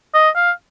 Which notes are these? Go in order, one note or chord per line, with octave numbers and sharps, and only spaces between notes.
D#5
F5